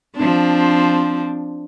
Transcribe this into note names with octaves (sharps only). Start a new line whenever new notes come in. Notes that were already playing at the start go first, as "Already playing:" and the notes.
F3 C4 D4